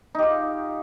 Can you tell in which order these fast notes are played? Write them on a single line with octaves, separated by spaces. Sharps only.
D#4 G4 F4